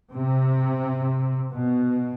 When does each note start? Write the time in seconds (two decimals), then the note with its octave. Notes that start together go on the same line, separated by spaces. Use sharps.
0.12 C3
1.51 B2